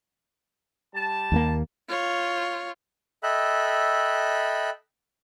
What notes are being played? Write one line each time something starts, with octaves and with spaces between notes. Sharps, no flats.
G3 A5
D#2 A3 A#3
F4 C#5
A4 D#5 E5 G5 B5 F#6